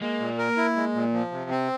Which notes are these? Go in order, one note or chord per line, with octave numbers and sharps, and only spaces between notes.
G#3 A#3
A#2
A#4
E4
G#3
A#2
F3
C3
C4